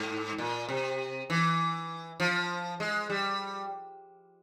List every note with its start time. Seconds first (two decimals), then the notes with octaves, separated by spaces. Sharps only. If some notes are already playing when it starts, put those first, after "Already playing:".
Already playing: G#2
0.38 A#2
0.69 C3
1.30 E3
2.20 F3
2.80 G#3
3.10 G3